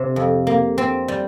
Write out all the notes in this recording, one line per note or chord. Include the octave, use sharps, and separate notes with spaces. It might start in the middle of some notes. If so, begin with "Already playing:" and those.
Already playing: C3
F2
A#3
C4
G3